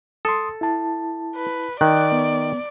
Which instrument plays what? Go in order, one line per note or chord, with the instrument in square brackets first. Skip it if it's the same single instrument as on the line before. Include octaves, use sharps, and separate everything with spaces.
[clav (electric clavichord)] A4 [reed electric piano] C6 D#6
[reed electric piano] E4 A5
[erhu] B4
[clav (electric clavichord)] D#3 [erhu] D5 [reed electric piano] F#6
[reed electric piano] B3